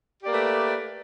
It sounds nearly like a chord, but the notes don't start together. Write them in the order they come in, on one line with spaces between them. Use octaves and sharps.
G4 D5 A#3 B4 A3